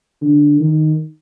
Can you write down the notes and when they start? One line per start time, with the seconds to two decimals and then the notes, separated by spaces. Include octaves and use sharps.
0.22 D3
0.60 D#3